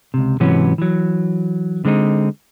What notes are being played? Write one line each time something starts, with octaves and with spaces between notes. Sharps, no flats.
C#2 C3
G#2 C3 E3 F#3 B3 C#4
E3 F#3
D3 G#3 C4 D#4